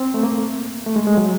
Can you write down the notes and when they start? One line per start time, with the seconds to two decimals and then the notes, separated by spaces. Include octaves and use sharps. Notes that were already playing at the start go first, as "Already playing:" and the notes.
Already playing: C4
0.14 A3
0.23 A#3
0.86 A3
0.96 G#3
1.07 G#3
1.17 F#3